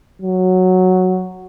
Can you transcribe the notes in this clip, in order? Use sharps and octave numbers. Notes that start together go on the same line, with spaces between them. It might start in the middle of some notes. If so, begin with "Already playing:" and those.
F#3